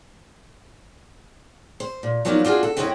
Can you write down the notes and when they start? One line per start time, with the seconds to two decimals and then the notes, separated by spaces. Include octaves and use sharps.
1.80 C5
2.03 A#2
2.25 F3 F#3 A#3 B3 D4 D#4
2.45 D4 F4 F#4 G#4
2.63 A4
2.77 F#2 C4 E4 C#5 D#5 G5